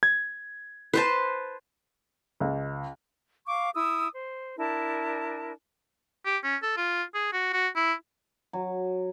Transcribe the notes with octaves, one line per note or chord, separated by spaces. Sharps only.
G#6
B4 C5 A5
C#2
F5 C#6 D6
E4 D#6 E6
C5
D4 E4 A#4 A5
G4
C#4
A4
F4
G#4
F#4
F#4
E4
F#3